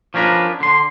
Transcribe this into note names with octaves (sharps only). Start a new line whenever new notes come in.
F3 C#4 D4 A#4 B4
D3 C6